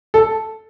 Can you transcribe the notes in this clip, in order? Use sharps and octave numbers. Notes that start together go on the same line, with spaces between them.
A4